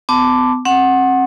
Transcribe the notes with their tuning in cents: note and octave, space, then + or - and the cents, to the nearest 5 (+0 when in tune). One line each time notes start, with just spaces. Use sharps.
B3 +40 A5 +0 D6 +0
C4 +40 F#5 +0